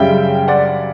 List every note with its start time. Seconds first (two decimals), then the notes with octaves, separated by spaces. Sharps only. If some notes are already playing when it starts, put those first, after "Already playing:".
Already playing: F#2 C#3 G3 E5 G5
0.48 D5 F#5